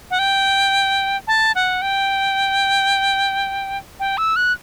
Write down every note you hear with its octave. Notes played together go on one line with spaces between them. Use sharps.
F#5
G5
A5
F#5
G5
G5
E6
F#6